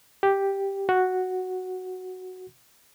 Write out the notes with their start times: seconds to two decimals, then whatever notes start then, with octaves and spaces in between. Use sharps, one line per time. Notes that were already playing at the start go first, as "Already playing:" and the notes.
0.23 G4
0.89 F#4